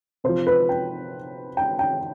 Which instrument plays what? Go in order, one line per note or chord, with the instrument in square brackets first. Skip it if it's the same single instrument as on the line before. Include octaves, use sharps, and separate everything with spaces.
[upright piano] C3 F3 C5
B4
G5
G5
G5